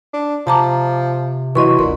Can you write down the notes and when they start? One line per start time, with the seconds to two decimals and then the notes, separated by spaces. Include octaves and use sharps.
0.14 D4
0.47 C3 F3 A5 A#5 D6
1.55 E3 F#3 D#5 C6 C#6
1.79 F#1 D2 A#2 C6